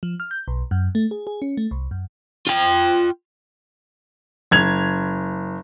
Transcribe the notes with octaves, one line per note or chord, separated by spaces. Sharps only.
F3
F6
G6
B1
F#2
A3
G#4
G#4
C#4
A3
C2
F#2
F4 G5
F#1 G#6 F7